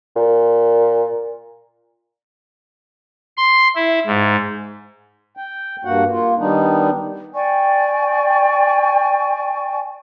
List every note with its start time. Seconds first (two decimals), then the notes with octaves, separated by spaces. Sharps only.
0.16 A#2
3.37 C6
3.76 E4
4.06 G#2
5.37 G5
5.85 G2 A#3 F#4 F#5
6.11 A#3 F4
6.39 D#3 G3 B3 D4 D#4
7.34 D5 G5 G#5 C#6